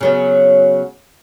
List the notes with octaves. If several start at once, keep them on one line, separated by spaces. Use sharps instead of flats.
C#3 F#3 B3